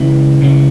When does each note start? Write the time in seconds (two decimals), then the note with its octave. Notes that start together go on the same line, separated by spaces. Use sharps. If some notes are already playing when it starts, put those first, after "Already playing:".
Already playing: C#2 C#3 E3
0.41 C#2 C#3 E3